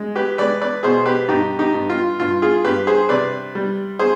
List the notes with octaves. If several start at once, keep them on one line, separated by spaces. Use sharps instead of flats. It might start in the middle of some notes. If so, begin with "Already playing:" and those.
Already playing: G#3
G4 B4
G#3 B4 D5
B4 D5
B2 G#4 C5
G4 B4
G2 D#4 G4
D#4 G4
G2
F4
G2 F4
F4 G#4
G2 G4 B4
G#4 C5
C3 B4 D5
G3
G#4 C5